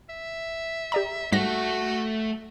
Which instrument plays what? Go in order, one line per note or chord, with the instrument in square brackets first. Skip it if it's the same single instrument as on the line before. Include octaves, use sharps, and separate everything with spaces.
[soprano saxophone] E5
[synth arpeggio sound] G4 D5 A#5
[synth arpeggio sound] G#2 G3 A#6 [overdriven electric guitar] A3 [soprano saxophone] F#4